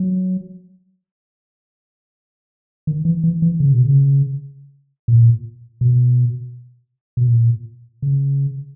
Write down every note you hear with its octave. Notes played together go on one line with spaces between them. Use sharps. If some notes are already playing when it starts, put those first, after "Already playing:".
Already playing: F#3
D#3
E3
E3
E3
C#3
B2
C#3
A#2
B2
B2
A#2
C#3